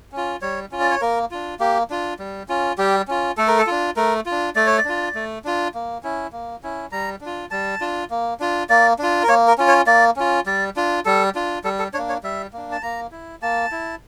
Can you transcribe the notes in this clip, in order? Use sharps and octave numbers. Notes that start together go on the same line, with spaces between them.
C#4
F4
G3 C#5
C#4 F4
D5
C#5
A#3 A#4
D4 F4
A#3 G4
D4 F4
G3
C#4 F4
G3 G4
C#4 F4
A3 A4
A#4
A4
D4 F4
A3 A#4
F4
D4
A3 D5
C#5
D5
D4 F4
A3
D4 F4
A#3
C#4 E4
A#3
C#4 E4
G3 A#5
D4 F4
G3 A5
D4 F4
A#3
D4 F4
A#3 D5
D4 F4
A#4
A#3 C#5
A#4
C#4 F4
C#5
A#3 D5
C#4 F4
G3 D5
D4 F4
G3 A4
D4 F4
G3 A4
A4
A#3 D4 C#5
C#5
G3 E5
A#3 D4
A5
A#3 A#5
E4
A#3 A5
E4